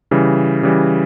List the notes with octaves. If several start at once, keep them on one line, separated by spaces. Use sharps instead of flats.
C#3 E3 G3
C#3 E3 G3